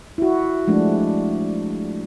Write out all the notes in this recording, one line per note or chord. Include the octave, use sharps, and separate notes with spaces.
E4 F#4
F3 G#3 A3 D4